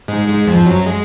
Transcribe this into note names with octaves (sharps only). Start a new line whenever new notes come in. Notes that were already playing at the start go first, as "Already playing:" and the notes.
G#2 G#3
G#2 G#3
F2 F3
F#2 F#3
G#3